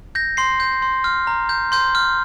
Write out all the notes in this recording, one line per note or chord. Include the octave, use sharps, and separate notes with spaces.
G6 A#6
C6 C7
G6
C6
F6
A#5
G6
C6 G6
F6